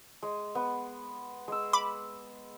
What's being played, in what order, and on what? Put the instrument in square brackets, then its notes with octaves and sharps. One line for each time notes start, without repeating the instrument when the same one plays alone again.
[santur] G#3
B3
G#3 E6
[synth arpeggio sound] B5 D6